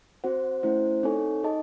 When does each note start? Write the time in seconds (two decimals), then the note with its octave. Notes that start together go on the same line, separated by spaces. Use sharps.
0.24 C4 F#4 C5 F#5
0.63 A3 C#4 E4 C5
1.03 C4 D#4 A4 C#5 G#5
1.43 D#4 G#4 D#5 A5